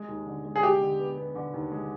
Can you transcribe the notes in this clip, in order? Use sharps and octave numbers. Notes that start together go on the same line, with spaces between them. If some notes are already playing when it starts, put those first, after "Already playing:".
Already playing: G#3
D#2
D3
G#3
G#4
G#3 G4
D3
B3
B3
D3
D#2
G#3